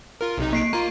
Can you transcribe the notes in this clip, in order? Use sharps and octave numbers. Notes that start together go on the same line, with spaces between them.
F4 A#4
B1 C3 D#4
A#3 C7 D7
A#3 F4 A#5